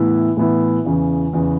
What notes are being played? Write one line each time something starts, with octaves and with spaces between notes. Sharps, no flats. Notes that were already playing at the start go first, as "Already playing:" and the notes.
Already playing: A2 E3 B3 E4
A2 E3 B3 E4
E2 C#3 E3
E2 C#3 E3